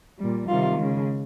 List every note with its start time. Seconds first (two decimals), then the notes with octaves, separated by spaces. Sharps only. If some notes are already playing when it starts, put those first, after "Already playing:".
0.19 G3
0.24 A#2
0.49 C3 D#3 G3 F4
0.78 C#3 G#3